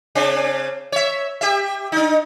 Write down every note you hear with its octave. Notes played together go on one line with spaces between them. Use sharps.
C#3 C4 D4
C#5 E5
G4 E5
D4 D#4